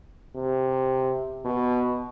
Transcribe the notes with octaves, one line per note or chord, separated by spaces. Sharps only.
C3
B2